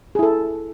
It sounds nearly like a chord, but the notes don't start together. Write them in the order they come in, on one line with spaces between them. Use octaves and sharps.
G#4 E4 A4